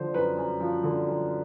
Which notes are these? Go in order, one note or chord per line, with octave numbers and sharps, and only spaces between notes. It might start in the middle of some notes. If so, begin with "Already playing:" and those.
Already playing: D3 F3 C5
F#2 B4
F#2
F3
D3
F#2